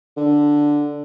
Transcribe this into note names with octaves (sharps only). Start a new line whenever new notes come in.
D3